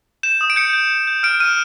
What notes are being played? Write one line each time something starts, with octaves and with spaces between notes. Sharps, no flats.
G6 E7
D#6
D7
G6 C#7
G6
G6
G6
F6 D7
F6 D#7